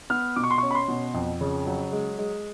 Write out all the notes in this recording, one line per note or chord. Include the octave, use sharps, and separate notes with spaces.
B3 F6
B2 D6
C#6
C6
C#4 C#6
B5
C6
B2
F2
C#3
F#3
G#3
G#3